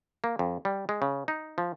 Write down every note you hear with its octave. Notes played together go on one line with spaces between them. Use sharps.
A#3
F2
G3
G#3
C#3
D#4
F3